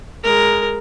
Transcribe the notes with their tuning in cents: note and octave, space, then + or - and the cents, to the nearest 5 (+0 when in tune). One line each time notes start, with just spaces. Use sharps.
G#3 +0 A#4 +0